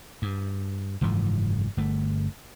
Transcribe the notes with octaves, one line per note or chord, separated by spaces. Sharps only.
G2
F#1 G#2 E3 F3
G1 A3